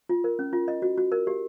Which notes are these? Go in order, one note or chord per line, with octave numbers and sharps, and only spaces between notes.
F4
A#4
C#4
F4
D#5
F#4
F#4
A#4
G4